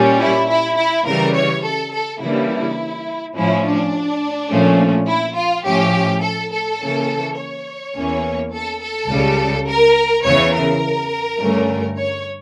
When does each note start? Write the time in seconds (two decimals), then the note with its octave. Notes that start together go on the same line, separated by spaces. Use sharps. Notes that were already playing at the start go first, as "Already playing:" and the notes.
Already playing: A#2 G3 C#4
0.19 E4
0.48 E4
0.77 E4
1.05 C#3 E3 G3 A#4
1.34 C#5
1.64 A4
1.92 A4
2.21 C#3 E3 G3 A#3 D4 E4
3.35 A2 F3 C#4 E4
3.65 D4
4.50 A#2 F3 A3 C#4
5.08 E4
5.36 F4
5.65 A2 F3 C#4 G4
6.22 A4
6.52 A4
6.80 C#3 E3 A#3 C#4
7.37 C#5
7.95 E2 E3 A#3 C#4
8.52 A4
8.81 A4
9.09 C#2 C#3 G3
9.68 A#4
10.24 E2 C#3 E3 C#5
10.53 A#4
11.40 G2 D3 A3 C#4
11.97 C#5